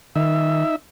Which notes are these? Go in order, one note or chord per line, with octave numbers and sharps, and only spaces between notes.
D#3 D#4 E5